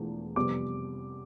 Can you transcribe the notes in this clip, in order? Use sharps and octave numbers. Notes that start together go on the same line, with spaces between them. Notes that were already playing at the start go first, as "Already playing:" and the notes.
Already playing: E1 E2 F3 A3
F2 C3 G3 B3 D6